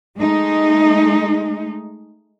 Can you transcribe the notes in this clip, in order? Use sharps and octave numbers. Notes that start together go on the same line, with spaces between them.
G#3 A3 D#4